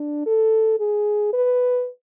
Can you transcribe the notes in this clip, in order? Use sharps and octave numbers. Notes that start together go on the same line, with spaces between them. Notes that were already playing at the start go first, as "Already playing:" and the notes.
Already playing: D4
A4
G#4
B4